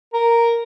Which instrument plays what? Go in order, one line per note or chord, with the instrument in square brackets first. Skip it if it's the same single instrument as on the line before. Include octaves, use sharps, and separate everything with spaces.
[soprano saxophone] A#4